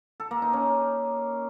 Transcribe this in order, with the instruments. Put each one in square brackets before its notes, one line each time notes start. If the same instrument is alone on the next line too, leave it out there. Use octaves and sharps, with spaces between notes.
[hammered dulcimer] A4
A#3
D#4
C#4